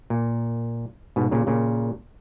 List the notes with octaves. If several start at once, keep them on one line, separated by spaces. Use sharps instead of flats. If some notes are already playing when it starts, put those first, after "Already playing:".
A#2
G#2 B2
A#2 C#3
A#2 C#3